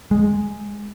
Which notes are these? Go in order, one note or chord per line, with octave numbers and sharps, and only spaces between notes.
G#3